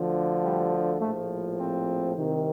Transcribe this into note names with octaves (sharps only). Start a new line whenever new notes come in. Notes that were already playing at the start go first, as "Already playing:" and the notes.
Already playing: D2 D3 F3
G3
A#1 A2 F3 A3
C4
C2 C3 D#3